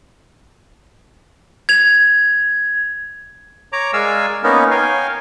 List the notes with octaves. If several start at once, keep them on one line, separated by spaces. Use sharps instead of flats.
G#6 F7
C#5 A#5 D6
G#3 A#4 D5 F5 G#5 E6
A#3 B3 C#4 D#4 A#4
A#4 C#5 F5 G5 G#5